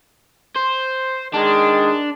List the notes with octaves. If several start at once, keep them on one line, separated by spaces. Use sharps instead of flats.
C5
D#3 G#3 D4